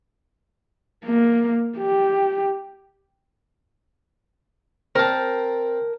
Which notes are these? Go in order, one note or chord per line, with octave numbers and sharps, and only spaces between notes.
A#3
G4
C4 A#4 C5 A5